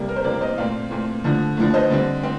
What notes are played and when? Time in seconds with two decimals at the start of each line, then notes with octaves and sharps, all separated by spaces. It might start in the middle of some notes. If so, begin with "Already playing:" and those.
Already playing: C3 G3 A#3
0.09 A#4
0.16 C5
0.24 C3 G3 A#3 A#4 D5
0.41 C5 D#5
0.58 A#2 A3 C4 D5 F5
0.90 A#2 A3 C4
1.24 D3 F3 A3
1.57 D3 F3 A3
1.74 C5 D#5
1.90 D3 G3 C4
2.23 C4